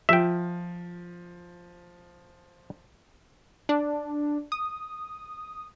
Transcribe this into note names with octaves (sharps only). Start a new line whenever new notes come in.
F3 E5 G5
D4
D#6